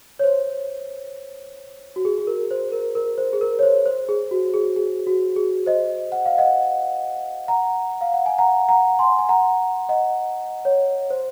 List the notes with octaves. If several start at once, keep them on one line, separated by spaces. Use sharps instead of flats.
C#5
C5
F#4
G#4
G#4
A#4
C5
A#4
A#4
C5
G#4
A#4
C#5
C5
C5
G#4
F#4
G#4
G#4
F#4
G#4
C5 D#5
F#5
F5
D#5 F#5
F#5 A#5
F5
F#5
G#5
F#5 A#5
F#5 A#5
G#5 C6
G#5
F#5 A#5
D#5 F#5
C#5
C5